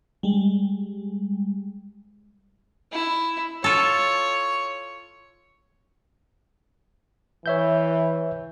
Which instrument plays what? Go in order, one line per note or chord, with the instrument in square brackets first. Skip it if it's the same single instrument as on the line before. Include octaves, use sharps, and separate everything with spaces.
[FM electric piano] G3 G#3
[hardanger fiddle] E4
[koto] F4 A4 [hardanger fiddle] C#5
[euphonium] E3 [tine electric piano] C#5 E5 G6